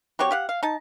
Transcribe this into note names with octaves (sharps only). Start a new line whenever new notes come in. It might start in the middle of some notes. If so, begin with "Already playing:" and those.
F#3 C4 G4 C#5
G4 F5 F#5
F5
D#4 A5